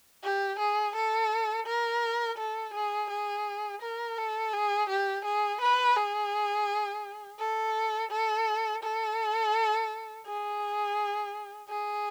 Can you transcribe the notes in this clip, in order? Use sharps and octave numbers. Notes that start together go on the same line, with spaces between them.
G4
G#4
A4
A#4
A4
G#4
G#4
A#4
A4
G#4
G4
G#4
B4
G#4
A4
A4
A4
G#4
G#4